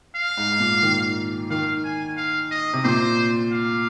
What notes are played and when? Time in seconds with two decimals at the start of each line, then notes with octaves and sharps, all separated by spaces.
0.16 F5
0.37 G#2
0.52 G#2
0.60 A#2
0.82 D#3
1.50 D#3 F5
1.84 G#5
2.17 F5
2.51 D#5
2.73 C3
2.84 A#2 C5
3.52 F5